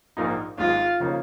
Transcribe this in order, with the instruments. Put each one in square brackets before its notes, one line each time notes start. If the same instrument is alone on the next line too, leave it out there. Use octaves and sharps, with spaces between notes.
[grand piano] A#1 G#2 F3 A#3 D#4
[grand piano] G#1 G#2 G#3 [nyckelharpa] F4
[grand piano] C#3 F3 A#3 D#4